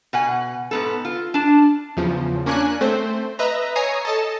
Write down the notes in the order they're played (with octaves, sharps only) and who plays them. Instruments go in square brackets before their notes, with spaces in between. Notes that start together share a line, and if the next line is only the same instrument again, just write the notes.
[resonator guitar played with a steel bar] B2 F#5 G#5
G#2 B3 A4
F4
D4 A5
[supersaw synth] E2 C#3 F3
A#3 C#4 D4 G#5 F#6
A3 C4 C5
B4 D#5 E5 A#5
C#5 G#5 A#5 D#6 C7
A4 D#5 A5